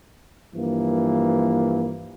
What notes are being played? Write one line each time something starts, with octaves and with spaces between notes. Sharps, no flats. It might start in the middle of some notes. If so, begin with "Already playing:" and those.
G2 E3 F3 A#3